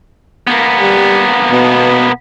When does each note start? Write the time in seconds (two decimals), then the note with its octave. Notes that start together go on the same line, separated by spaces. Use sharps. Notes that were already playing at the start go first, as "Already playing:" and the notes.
0.47 A#3 B3
0.77 G3
1.51 B2